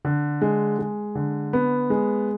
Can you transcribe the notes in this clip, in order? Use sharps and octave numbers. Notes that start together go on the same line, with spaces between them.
D3
G#3
G#3
D3
B3
G#3